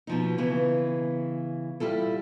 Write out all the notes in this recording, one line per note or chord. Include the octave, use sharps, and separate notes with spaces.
B2 F3 D#4
C#3 E3 B3
G3 E4 F4 A4